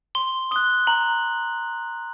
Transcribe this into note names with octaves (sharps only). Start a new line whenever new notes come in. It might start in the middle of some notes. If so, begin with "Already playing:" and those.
C6 G7
D#6 F#6 G7
A#5 F#7